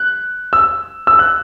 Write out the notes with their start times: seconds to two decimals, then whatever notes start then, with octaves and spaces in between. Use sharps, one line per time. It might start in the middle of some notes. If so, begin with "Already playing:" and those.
Already playing: F#6
0.53 E6
1.07 E6
1.19 F#6